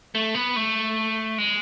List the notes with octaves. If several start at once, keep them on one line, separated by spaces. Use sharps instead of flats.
A3
B3
A3
G#3